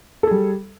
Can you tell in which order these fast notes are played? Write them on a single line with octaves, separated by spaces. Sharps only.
A4 G#4 G3